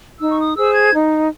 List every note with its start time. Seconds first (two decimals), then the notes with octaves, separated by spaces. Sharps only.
0.19 D#4 E6
0.31 C#6
0.38 D#6
0.56 G#4 C5 E6
0.74 G#6
0.92 D#4